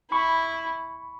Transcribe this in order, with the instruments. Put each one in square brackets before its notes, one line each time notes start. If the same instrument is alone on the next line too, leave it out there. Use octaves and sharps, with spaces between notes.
[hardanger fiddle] E4 [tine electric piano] B5 C#6